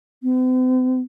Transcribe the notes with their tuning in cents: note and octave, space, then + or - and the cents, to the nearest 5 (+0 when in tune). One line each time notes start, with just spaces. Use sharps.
C4 -45